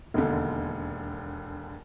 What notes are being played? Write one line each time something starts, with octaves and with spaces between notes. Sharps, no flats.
E1 D#2 D3